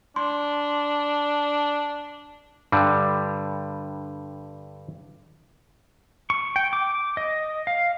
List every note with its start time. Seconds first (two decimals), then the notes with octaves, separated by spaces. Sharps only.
0.16 D4 C6
2.72 G2 D3 G3
6.30 C#6
6.56 G5
6.73 D6
7.17 D#5
7.67 F5